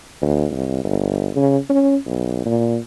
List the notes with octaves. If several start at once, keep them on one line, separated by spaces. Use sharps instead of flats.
D2
C2
G1
C#3
C#4
B1
A#2